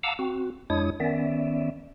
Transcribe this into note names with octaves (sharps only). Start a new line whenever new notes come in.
F5 F#5 A5 A#5 D6 E6
C4 F#4
F2 G#3 D4 E4 C#5 D#6
D#3 B3 C#4 D5 E5